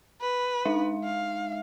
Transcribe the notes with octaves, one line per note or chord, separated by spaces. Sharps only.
B4
G#3 D#4 E5
F5